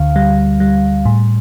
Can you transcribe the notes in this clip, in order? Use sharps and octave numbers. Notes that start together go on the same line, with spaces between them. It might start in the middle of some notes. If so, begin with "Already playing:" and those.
Already playing: D2 D3 F5
G3
G3
A2